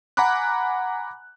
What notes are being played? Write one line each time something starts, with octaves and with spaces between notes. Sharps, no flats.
F#5 G#5 A#5 B5 D6 F#6